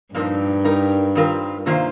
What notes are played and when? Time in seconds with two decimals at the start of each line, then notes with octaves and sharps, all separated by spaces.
0.14 G2 A#2 F3 C4 D#4 A#4
0.65 G3 D#4 A#4
1.15 D#3 G3 C4 F4 A#4
1.66 C3 D#3 A#3 F4 C5